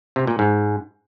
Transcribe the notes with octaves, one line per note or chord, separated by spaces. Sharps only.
C3
A#2
G#2